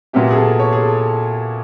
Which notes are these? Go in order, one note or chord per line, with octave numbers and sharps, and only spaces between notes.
A#2 F#3 B3 E4 G4
G#4
A4
C#5
G#4
A4